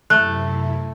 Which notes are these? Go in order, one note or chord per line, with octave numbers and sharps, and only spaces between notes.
F#2 C3 A3 E4 F#6